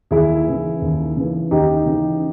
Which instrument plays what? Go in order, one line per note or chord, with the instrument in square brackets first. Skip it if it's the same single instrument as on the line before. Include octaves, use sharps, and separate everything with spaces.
[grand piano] D#2 E4 G#4
C#3 E3
D#2
C#3 E3
D#2 D#4 G4
C#3 E3